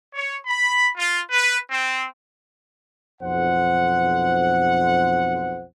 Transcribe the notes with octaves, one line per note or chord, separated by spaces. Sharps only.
C#5
B5
F4
B4
C4
B1 F2 C5 F#5